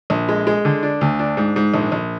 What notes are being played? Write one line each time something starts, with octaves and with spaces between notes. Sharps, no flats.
A#1
G#3
G#3
D3
D4
D2
D4
G#2
G#2
A#1
A#1